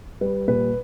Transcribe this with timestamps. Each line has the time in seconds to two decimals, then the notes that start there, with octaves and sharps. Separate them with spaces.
0.21 G3 B4
0.48 A#2 B4